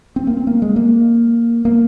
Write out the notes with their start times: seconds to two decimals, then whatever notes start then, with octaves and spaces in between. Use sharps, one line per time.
0.16 C4
0.27 A#3
0.37 C4
0.47 A#3
0.62 G#3
0.76 A#3
1.65 A#3